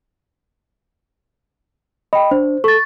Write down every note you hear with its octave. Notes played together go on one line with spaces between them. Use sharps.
D#5 G5 B5
D4 C5
A4 C#6 A6